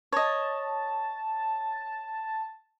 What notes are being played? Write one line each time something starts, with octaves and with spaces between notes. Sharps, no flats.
C#5 D#5 A5